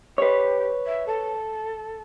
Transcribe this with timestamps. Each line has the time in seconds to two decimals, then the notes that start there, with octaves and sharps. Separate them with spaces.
0.18 G4 B4 C#5
0.87 E5
1.07 A4